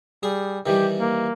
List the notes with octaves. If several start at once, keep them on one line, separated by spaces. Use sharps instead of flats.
G3 G#4
D#3 E3 G3 G4
A#3